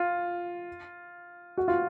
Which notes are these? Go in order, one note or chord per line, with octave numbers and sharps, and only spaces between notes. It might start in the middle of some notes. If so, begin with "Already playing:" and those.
Already playing: F4
F#4
F4